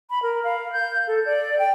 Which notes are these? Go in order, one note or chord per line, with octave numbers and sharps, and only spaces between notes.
B5
A#4
F5
G6
A4
D5
G5